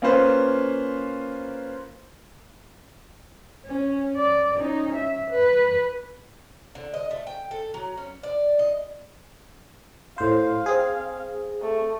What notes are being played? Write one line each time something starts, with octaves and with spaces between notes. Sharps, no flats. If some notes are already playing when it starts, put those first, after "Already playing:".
A#3 C#4 F4 B4 C5
C#4
D5
C#4 D#4
E5
B4
D3
D#5
A3
G5
A4
F#3
C#4
D5
D#5
A2 C5 F5
C4 G#4
A3